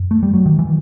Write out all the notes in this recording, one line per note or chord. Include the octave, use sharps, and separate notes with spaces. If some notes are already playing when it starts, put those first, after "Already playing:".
Already playing: F#2
A3
G3
F#3
D#3
E3